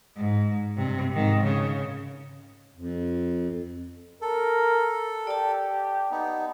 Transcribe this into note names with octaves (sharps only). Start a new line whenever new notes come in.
G#2
G2 C3
G#2 D#3
C#3
F2
A4 A#4
G4 D5 A5
B3 D#4